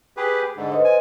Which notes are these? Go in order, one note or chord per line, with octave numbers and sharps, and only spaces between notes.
G4 G#4 B4
G#2 D3
B4 C5 D#5
G#5